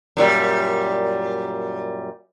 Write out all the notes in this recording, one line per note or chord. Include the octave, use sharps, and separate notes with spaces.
F#2 A#2 G3